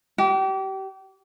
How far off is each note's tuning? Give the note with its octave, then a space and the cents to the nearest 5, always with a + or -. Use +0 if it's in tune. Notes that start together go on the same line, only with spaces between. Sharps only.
G4 -30